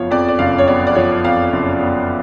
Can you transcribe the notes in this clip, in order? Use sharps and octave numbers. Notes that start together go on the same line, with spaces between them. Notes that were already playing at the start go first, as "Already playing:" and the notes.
Already playing: F#1 F2 F3 B3 C#5 F5
F2 D5
D5
F#1 F5
C#5
B3 D5
D5
F3 C#5
F2 F5
F#1
B3